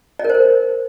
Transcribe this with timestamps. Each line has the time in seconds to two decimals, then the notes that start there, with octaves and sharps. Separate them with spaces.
0.19 D5
0.24 A#4
0.30 C5
0.35 A#4